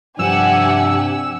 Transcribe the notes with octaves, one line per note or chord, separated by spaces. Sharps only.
G2 C3 F3 D4 G4 F#5 G#5 E6